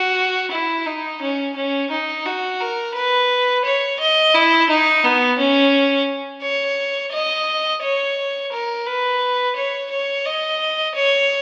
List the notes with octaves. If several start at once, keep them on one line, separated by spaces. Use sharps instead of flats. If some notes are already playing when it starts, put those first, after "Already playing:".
Already playing: F#4
E4
D#4
C#4
C#4
D#4
F#4
A#4
B4
C#5
D#5
E4
D#4
B3
C#4
C#5
D#5
C#5
A#4
B4
C#5
C#5
D#5
C#5